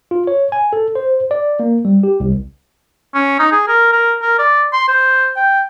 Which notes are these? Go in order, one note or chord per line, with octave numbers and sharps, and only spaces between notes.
F4
C#5
G#5
A4
C5
D5
A#3
G3
G4
C2
C#4
D#4
G#4
A#4
A#4
A#4
D5
C6
C5
G5